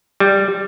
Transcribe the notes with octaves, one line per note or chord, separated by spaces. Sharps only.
G3